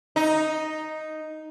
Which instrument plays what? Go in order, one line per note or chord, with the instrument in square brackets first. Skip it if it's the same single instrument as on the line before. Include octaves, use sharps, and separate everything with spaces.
[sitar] D#4